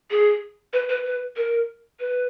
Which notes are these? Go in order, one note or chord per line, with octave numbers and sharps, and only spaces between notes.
G#4
B4
B4
B4
A#4
B4